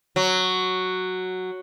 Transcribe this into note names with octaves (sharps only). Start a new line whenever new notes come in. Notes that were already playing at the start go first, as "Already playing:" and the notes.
F#3